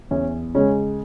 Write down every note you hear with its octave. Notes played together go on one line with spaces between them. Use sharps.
E2 C#4
C#3 G#3 C#4